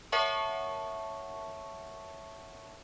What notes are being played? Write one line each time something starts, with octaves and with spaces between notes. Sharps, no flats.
A#4 C#5 E5 F#5 A5 C#6